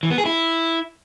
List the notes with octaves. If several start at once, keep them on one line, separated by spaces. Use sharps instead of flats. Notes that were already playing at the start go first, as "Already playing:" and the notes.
E3
B3
G#4
E4